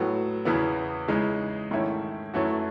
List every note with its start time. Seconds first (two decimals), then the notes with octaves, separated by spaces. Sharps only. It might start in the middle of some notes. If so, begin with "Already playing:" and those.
Already playing: A2 F#3 B3
0.45 E2 C#3 E3 B3
1.08 C#3 E3 G#3 D#4
1.71 G#2 D#3 A3 C#4 E4
2.34 F#2 E3 A3 C#4 F#4